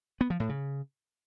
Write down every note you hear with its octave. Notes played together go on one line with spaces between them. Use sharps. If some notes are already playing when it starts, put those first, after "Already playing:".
B3
F3
A2
C#3